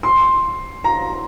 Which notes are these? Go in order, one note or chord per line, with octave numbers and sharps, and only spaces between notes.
C6
A#5